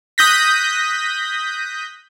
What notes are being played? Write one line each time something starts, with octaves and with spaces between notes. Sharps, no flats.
D#6 F#6 G6 A#6 B6